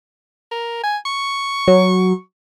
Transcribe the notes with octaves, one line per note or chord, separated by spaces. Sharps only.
A#4
G#5
C#6
F#3